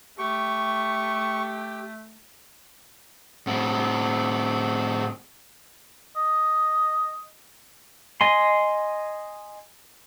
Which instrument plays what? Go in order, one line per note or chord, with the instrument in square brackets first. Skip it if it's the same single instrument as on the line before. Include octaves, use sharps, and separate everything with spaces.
[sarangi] A3 [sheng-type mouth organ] G4 G5 [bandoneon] C#6
[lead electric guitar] A2 C4
[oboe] D#5
[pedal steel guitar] D#5 G#5 C6